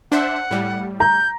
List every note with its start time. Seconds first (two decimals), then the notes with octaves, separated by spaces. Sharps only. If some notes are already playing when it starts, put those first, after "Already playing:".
0.12 D4 C5 E5 F#5
0.51 A2 G3
1.00 A#5 G6